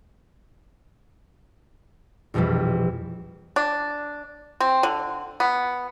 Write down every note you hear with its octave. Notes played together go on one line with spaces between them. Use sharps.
A#1 F2 B2 E3 G3
D4
C4
D3
B3